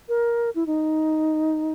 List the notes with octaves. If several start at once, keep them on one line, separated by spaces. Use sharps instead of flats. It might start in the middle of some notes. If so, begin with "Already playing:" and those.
A#4
E4
D#4